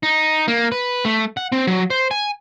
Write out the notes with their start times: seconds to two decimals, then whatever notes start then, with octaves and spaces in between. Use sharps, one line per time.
0.03 D#4
0.48 A#3
0.72 B4
1.05 A3
1.37 F#5
1.52 C4
1.67 F#3
1.90 C5
2.11 G#5